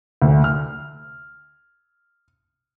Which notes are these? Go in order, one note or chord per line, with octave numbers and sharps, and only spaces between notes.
D2
F6